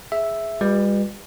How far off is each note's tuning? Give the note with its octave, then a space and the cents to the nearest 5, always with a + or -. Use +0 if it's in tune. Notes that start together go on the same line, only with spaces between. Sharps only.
G#4 +5 E5 +0
G3 +45 F#4 -40 B4 -5